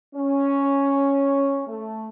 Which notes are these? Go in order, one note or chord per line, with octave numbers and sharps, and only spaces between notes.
C#4
A3